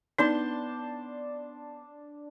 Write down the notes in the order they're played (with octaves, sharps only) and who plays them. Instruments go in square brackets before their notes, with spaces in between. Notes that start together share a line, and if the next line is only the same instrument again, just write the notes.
[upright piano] B3 G6 [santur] D4 A5 C6 [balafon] D#4